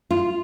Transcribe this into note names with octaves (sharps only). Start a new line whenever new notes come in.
F4